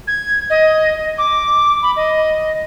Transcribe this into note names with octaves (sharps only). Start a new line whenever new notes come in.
G#6
D#5
D6
B5
D#5